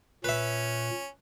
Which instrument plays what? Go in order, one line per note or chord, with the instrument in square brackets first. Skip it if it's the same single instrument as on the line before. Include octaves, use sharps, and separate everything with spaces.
[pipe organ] A#2 [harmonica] C#4 [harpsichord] B4 E5